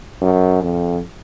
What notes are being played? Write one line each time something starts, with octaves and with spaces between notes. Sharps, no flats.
F#2
F2